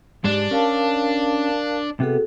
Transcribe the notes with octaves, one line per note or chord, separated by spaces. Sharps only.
G#2 G#3 D4 G4
C#4 A#4 F5 A5
C3 B3 F#4 G#4 A4